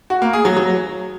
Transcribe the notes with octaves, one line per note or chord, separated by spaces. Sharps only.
F#4
A#3
G#4
F#3
F#3